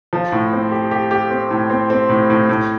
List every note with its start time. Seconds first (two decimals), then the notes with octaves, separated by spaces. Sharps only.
0.13 F3
0.32 A2
0.52 C4
0.72 G4
0.91 G4
1.11 G4
1.30 C4
1.51 A2
1.70 C4
1.90 C4
2.09 A2
2.30 A2
2.49 A2